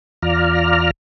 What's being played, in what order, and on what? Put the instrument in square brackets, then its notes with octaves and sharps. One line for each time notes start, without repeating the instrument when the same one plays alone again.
[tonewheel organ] E2 F4 D5 A#5 F6